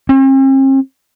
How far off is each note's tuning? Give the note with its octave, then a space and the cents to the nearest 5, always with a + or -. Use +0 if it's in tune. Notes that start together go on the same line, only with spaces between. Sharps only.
C4 +45